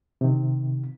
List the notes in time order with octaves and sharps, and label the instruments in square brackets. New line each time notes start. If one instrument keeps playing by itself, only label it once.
[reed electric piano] C3 D#3